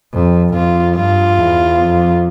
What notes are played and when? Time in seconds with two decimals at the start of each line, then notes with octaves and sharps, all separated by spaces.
0.13 F2
0.54 F2 F4
0.96 G2 F4
1.38 E2
1.78 F2